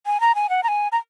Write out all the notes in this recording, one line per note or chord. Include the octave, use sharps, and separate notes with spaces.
G#5
A#5
G#5
F#5
A#5
G#5
A#5